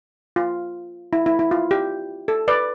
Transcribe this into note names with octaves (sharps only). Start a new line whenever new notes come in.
F4
E4
E4
E4
F4
G4
A4
B4 D5